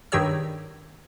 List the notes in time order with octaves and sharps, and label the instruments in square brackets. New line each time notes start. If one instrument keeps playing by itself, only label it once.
[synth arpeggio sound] G2 D#3 G4 G#4 C#5 E6